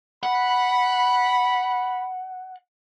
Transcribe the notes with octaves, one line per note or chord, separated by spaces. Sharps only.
F#5 B5